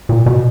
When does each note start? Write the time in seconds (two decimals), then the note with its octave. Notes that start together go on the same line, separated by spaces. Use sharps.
0.09 A#2
0.26 B2